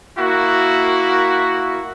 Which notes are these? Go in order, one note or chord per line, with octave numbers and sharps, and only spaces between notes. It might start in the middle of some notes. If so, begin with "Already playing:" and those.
A#3 E4 F#4